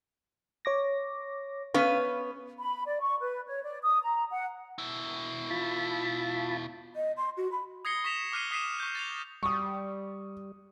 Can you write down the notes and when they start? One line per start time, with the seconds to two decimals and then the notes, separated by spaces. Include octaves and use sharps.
0.65 C#5 D6 A#6
1.74 B3 C#4 B4 F5
2.59 B5
2.86 D5
3.00 C#6
3.20 B4
3.47 C#5
3.63 D5
3.82 D#6
4.03 A#5
4.31 F#5
4.78 B2 E4
5.51 F4 A5 B5
6.96 D#5
7.17 C6
7.37 F#4
7.52 B5
7.85 D#6 G#6 A#6 C7 C#7 G7
8.04 C#6 A#6 B6 E7 F7
8.32 D6 F6 F#6 C7 D#7 G7
8.51 D#6 B6 C7 D#7 E7
8.80 C#6 G6
8.95 A6 C7 F7
9.43 G3 C#6 D#6